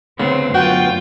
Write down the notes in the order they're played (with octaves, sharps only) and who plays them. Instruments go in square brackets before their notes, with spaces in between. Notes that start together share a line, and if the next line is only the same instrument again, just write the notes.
[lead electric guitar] D2 B3 [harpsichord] C#3 [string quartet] C4
[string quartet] F#2 F4 [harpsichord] F#4 [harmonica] G5